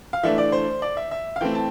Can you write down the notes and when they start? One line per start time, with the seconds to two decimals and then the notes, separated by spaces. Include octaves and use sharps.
0.13 F5
0.23 E3 A3 D4 E5
0.38 D5
0.52 C5
0.82 D5
0.97 E5
1.11 E5
1.36 F5
1.41 E3 A3 C4 G5
1.55 A5